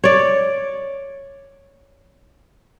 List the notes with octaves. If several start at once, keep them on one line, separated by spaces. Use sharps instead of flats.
C#5 D5